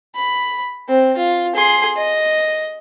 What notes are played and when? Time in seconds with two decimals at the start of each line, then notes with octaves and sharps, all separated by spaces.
0.16 B5
0.88 C4
1.17 F4
1.55 G#4 C6
1.96 D#5